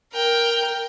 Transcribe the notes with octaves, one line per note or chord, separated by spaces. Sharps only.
A#4 G5